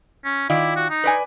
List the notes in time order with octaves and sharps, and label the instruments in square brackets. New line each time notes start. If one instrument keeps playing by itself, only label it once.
[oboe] C#4
[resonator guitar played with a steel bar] D#3 F4 D5 [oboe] E4
[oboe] F#4
D#4
[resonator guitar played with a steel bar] B4 D5 G#5